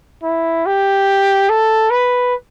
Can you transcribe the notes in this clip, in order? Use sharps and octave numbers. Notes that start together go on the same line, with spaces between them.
E4
G4
A4
B4